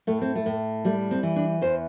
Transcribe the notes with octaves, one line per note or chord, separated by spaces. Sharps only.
A2 A3
C4
A3
A2
G3 A3
C4
E3
D4
E2 C5